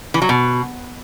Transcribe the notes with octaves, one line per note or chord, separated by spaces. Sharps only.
E3
F#3
B2